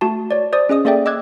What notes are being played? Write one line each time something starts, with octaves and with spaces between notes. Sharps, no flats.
A3 F#4 A5
C#5 D5
C5 D5 D#6
C#4 G#4 D#5 D#6
A#3 G#4 A4 D5 E5 G5
D#5 D6 E6 F#6 G#6